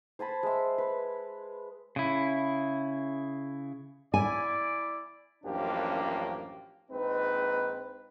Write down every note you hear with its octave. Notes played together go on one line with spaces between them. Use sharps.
C5 G#5 A5 B5
G#3 E5
B4
C#3 E4
E4 D5 G#5
A1 F#2 F3 A#3 D4 G4
A#1 G#3 C4 D#4 B4